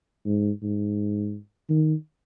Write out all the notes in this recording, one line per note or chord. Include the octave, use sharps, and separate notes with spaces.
G#2
G#2
D#3